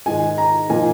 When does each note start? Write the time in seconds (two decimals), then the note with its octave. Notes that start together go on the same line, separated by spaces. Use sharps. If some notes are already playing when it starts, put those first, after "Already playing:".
0.06 G#2 D#3 G#3 G#5
0.38 A#5
0.70 A#2 F3 A#3 D#4 G#5